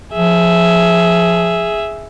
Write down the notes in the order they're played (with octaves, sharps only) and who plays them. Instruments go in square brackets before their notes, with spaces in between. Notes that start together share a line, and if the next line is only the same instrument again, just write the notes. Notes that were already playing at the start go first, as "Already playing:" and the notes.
[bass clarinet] F3 [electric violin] G#4 E5